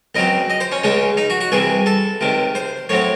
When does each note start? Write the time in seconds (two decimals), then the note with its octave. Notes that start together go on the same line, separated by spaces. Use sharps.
0.15 C#2 C#3 F#3 C4 D#5
0.50 D#5
0.60 C5
0.72 C#4
0.83 C#2 C#3 G#3 C#4
1.17 D#4
1.30 F#4
1.40 F#4
1.52 C2 C3 E3 G#4
1.86 A4
2.21 C#2 C3 D#3
2.55 C5
2.89 A2 F#3 C4 C#5